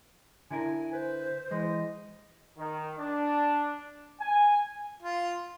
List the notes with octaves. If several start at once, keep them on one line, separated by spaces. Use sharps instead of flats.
D3 E4 A#4 G#5
B4 C5
E3 G#3 D#5
D#3
D4
G#5
F4